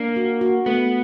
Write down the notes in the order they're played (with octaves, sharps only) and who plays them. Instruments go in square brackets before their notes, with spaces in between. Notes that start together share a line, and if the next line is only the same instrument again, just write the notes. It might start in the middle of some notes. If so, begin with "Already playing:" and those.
Already playing: [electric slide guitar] A#3 [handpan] D4
[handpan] F#4
F#4
[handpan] A3 [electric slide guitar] B3